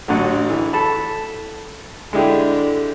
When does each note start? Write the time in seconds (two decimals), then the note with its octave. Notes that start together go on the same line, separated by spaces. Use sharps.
0.08 A1 D3 F#3
0.50 E3
0.73 A4 A5 B5
2.13 D3 G#3 E4 G4